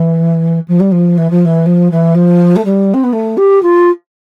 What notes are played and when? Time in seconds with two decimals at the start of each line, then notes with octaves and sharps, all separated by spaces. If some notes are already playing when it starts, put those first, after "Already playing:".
Already playing: E3
0.68 F3
0.80 G3
0.92 F3
1.18 E3
1.31 F3
1.45 E3
1.66 F3
1.92 E3
2.15 F3
2.56 A3
2.65 G3
2.94 C4
3.04 B3
3.13 A3
3.37 G4
3.63 F4